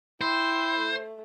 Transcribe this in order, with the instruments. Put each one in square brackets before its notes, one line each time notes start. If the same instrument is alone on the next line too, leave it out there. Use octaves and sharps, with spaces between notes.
[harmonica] E4 [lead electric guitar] C5 [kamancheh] G5 C6
[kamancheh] A3